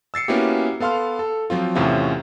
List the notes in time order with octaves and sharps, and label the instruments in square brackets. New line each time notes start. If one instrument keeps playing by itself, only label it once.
[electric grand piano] E6 A6 C7 C#7
A#3 B3 C#4 E4 F#4 G4
B3 A4 F5 C6 F6
A4
F3 F#3 C4 F4
E2 A2 C3 C#4 F4 E5